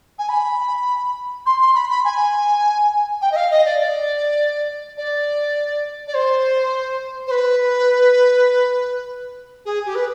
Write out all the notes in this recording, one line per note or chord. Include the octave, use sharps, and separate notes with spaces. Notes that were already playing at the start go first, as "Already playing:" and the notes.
G#5
B5
C6
C6
B5
B5
G#5
G5
D#5
F5
D#5
D5
D5
D5
D5
C5
C5
B4
G#4
G4
B4